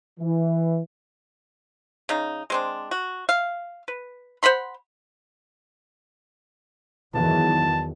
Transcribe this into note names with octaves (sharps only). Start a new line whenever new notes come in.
E3
C#3 D#4
G#3 C4 D4
F#4
F5
B4
C5 F#5 B5 C6
E2 D#3 F#3 A5